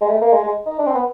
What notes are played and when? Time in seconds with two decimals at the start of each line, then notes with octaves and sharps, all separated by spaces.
0.01 G#3
0.09 A3
0.21 A#3
0.32 G#3
0.43 G#3
0.66 D#4
0.78 D4
0.87 C4
0.94 B3